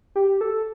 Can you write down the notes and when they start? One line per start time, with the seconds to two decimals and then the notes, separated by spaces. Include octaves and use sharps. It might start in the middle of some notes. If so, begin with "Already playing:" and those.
0.16 G4
0.41 A4